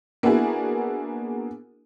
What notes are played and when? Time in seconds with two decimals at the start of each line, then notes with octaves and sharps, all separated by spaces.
0.23 A#3 B3 D4 E4 F#4 G#4